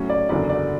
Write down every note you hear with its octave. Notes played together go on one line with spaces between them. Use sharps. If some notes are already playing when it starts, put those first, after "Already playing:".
Already playing: A2 F#3 C#4
D5
F#1 E2 D3 F#3 D5
D5